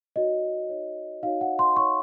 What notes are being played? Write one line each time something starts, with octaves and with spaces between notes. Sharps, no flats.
D#4 F#4 C#5 D#5
D#4 F#4 C#5
D#4 F#4 C#5 F5
F#5
C6
D#4 F#4 C#5 C#6